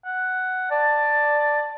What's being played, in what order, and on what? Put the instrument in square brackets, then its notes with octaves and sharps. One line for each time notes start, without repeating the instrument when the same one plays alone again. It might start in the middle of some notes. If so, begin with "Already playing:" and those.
[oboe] F#5
[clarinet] D5 [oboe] A5